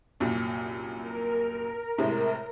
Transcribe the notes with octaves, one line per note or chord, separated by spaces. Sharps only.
C2 F#2 A#2
A#4
A2 C3 G#3